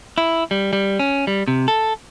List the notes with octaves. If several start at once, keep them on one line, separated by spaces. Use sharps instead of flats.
E4
G3
G3
C#4
G3
C3
A4